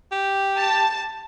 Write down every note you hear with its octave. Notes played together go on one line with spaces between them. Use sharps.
G4
A5